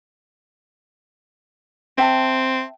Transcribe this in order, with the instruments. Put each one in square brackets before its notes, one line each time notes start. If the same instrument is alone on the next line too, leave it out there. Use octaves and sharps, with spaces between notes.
[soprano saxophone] C4 [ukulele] E5 G5 A5